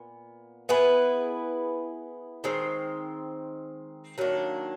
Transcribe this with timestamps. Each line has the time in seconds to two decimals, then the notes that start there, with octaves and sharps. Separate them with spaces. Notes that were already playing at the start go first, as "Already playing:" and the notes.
Already playing: A#2 B3
0.69 B3 E4 G#4 B4
2.44 D#3 G#3 C4
4.18 D#3 F#3 A#3 D4